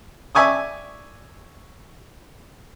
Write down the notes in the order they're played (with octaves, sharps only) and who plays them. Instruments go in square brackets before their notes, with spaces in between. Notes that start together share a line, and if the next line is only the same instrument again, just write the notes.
[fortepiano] D5 E5 G#5 C#6 D#6